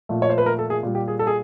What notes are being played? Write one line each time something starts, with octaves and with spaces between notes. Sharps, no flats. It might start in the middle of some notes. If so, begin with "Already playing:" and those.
A#2 F3 A3
C#5
C5
B4
A#4
A4
G#4
A#2 G3
G4
G#4
A4
G#4